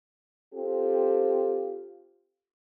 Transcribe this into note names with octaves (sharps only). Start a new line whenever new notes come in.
C4 F4 G4 A4